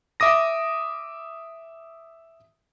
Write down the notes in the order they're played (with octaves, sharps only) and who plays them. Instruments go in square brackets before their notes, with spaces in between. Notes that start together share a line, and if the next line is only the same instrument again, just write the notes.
[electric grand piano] E5 D6 D#6 A#6